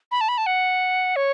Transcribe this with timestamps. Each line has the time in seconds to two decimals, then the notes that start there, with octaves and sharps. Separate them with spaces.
0.11 B5
0.21 A5
0.28 B5
0.38 A5
0.46 F#5
1.16 C#5